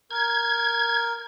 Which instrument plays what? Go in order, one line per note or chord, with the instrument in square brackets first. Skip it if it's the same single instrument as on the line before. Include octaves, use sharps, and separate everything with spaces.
[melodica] A#4 [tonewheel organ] G#6